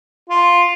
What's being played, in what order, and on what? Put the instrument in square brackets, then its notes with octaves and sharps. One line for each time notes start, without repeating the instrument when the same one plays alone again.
[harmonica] F4